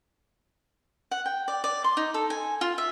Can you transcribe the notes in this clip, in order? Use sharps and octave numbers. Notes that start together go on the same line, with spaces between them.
F#5
G5
D5
D5
C6
D#4
A4
G#5
F4
E5